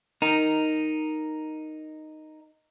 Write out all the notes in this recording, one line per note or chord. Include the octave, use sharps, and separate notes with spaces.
D#4 A#4